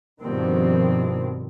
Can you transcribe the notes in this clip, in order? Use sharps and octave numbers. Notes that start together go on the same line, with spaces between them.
G2 B2 D#3 F3 C4